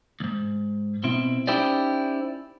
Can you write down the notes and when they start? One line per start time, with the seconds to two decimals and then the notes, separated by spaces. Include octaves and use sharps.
0.20 D2 G#2
1.04 B2 C4 E4
1.47 C#4 D#4 E4 G4 C5 D5